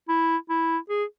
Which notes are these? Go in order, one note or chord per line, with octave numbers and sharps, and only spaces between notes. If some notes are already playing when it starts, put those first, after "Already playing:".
E4
E4
G#4